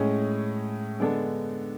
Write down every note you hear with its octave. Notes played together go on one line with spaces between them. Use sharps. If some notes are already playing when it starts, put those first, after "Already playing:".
Already playing: A2 G#3 C#4 G#4
D3 G#3 B3 D4 A4